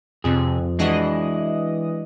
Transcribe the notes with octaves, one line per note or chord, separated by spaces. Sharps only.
F2 C3 G#4
E3 G#3 D4 F#4 D#5